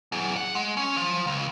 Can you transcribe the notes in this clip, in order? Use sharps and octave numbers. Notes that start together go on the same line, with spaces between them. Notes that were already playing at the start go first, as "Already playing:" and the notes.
F#3 G#4
F#5
G#3
C#4
F3
C#2